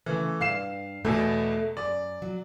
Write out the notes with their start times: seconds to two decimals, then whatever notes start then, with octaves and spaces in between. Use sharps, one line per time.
0.06 C#3 E3 A3
0.41 G2 F5 C7 E7
1.05 E2 B2 A3 A4
1.77 F#2 D5
2.22 F#3